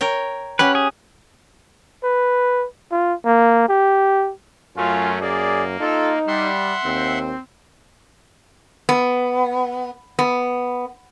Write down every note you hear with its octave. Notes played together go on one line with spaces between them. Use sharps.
A#4 C#5 G5
C#4 G4 B4 F#5
G#4
B4
F4
A#3
G4
F#2 F#3 A3 C#4 F4 G#5
A#3 G#4 D5
D#4 F4 A4
G3 E5 F#5 C6
D#2 C4
B3
B3